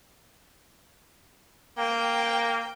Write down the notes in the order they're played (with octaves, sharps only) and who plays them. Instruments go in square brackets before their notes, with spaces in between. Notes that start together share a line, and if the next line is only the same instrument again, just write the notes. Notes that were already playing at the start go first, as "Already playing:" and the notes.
[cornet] A#3 [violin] G5